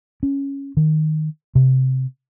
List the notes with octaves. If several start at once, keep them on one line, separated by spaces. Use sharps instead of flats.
C#4
D#3
C3